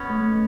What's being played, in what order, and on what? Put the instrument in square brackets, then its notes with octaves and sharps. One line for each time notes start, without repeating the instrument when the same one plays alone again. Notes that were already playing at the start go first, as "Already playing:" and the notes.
Already playing: [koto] B3 C#4
[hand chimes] A3